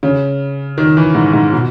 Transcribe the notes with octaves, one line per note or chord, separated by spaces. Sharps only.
C#3
D#3
E3
G#2
G#2
B2